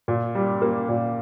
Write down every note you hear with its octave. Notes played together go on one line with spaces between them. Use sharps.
A#2
G3
A#3
A#2